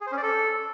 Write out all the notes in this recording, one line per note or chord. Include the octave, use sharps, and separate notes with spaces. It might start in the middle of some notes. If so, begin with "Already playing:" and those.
G#4
C5
C#4
D5
A4